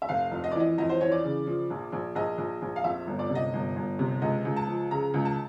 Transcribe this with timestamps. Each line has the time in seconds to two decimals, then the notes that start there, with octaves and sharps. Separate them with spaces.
0.02 E5
0.09 F1 F5
0.31 F2
0.44 D#5
0.52 D5
0.55 E3 D#5
0.78 F2 D#5
0.89 C5
1.01 E3 C#5
1.12 D5
1.24 C#3
1.46 F3
1.70 A#1
1.92 A#1
2.15 A#1 D#5
2.38 A#1
2.62 A#1
2.76 F5
2.84 F2 E5
3.07 G1
3.19 D5
3.30 C3
3.35 D#5
3.53 G1
3.76 G1
3.99 C3
4.22 C#2 D#5
4.45 C#2
4.56 A5
4.67 F3
4.91 C#3 A#5
5.14 C#2
5.25 A5